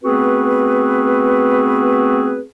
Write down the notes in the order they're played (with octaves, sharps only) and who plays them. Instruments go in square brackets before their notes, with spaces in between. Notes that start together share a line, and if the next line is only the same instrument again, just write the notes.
[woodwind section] A3 B3 C4 F#4 G#4 B4